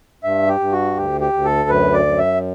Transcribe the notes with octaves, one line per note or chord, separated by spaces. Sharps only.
G2 E5
G4
G2
F#4
D2 G4
G4
D2
A4
F#2 B4
D5
F#2
E5